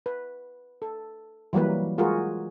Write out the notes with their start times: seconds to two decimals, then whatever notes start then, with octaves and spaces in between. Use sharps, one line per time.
0.06 B4
0.82 A4
1.53 E3 F#3 G3 A#3 B4
1.98 G#3 F4 F#4 G#4 A#4